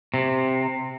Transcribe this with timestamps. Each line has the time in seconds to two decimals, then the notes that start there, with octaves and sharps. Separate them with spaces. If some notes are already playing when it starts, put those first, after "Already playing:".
0.14 C3